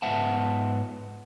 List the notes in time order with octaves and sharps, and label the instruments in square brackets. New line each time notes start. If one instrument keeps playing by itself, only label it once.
[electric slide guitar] G#2 B3 E5 F#5 A5